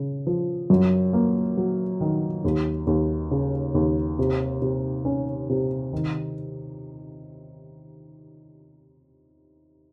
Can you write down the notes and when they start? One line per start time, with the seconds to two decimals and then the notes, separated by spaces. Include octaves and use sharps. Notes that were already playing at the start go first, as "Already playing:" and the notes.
Already playing: C#3
0.27 F3
0.70 F#2
1.13 A#3
1.57 F#3
2.01 D#3
2.45 D#2
2.87 D#2
3.31 C#3
3.75 D#2
4.19 C3
4.62 C3
5.05 C#4
5.49 C3
5.93 D#3